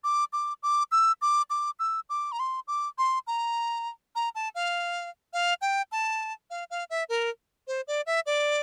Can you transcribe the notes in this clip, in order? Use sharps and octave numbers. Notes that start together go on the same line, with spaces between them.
D6
D6
D6
E6
D6
D6
E6
D6
A#5
C6
D6
C6
A#5
A#5
A5
F5
F5
G5
A5
F5
F5
E5
A#4
C5
D5
E5
D5